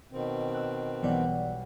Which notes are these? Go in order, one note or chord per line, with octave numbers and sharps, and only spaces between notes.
B2 D#3 C4
E6 F#6
B1 E3 G3 B3 D5 F#5